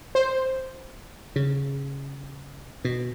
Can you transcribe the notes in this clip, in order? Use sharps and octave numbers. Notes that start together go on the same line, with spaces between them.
C5
C#3
B2